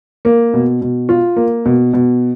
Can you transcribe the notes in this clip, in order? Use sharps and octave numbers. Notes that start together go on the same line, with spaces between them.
A#3
B2
B2
F4
A#3
B2
B2